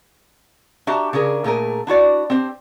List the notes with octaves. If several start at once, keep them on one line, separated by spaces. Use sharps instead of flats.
D4 F#4 G4 E5 A5 A#5
C#3 D4 G#4 A#4
A#2 A3 G#4 A#4
D4 E4 F#4 D5
C4 G4 C5